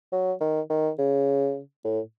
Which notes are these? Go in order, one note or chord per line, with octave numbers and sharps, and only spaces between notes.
F#3
D#3
D#3
C#3
A2